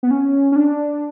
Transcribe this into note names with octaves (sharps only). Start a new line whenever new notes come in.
B3
C#4
C#4
D4